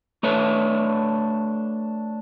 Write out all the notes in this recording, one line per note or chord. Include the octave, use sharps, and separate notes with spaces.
A3 D4 B4 C#5 D5 E5